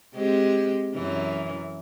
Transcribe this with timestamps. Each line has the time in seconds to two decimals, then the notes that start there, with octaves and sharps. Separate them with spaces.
0.15 G#3 C4 G4
0.94 F#2 E3